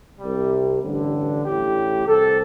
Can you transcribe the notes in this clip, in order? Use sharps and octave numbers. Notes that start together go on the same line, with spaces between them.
C2 C3 G3
A1 G2 D3
A1 A2 G4
C2 C3 A4